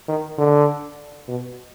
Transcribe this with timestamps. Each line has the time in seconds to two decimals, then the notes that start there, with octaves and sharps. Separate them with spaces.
0.08 D#3
0.38 D3
1.28 B2